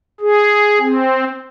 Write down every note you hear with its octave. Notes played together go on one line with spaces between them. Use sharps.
G#4
C4